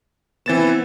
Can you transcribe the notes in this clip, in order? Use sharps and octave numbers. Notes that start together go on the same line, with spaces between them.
E3 B3 C4 A6 E7